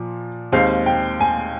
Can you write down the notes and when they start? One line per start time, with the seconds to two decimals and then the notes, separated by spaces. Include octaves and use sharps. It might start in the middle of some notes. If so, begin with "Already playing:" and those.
Already playing: A#2 F3
0.52 D#2 D#3 G#3 C4 F5
0.86 G5
1.20 G#5